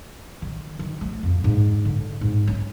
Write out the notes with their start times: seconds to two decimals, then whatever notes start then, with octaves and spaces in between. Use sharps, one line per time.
0.42 D#3
0.79 D#3
1.01 A3
1.23 F2
1.44 G#2
1.85 D3
2.21 G#2
2.47 C#4